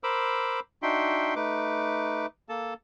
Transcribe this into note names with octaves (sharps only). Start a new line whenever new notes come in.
A#4 C5 B5 D6 E6
D4 D#4 F#4 E5 G5 C6
A3 D#4 B4 D6
A#3 A4 A5